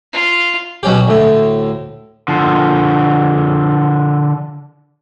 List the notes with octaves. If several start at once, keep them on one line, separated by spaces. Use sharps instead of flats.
F4
B2 F#3 C#4 G4
D2 A2
D3 F3